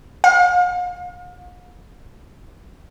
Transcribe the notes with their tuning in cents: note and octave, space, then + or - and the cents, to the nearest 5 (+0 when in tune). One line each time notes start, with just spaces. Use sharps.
F5 +40